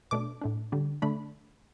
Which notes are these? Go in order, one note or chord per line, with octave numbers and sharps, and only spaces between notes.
B2 A3 D4 D6
A2 A3 D4
D3 G3 D4
D3 A3 D4 B5